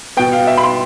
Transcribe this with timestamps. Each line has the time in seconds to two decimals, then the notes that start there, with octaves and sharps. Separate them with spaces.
0.17 B2 B3 G5
0.33 F5
0.47 E5
0.57 B5
0.63 C6